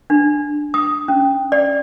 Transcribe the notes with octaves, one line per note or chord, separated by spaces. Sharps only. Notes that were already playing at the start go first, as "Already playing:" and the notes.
D4
D#6
C#4
D5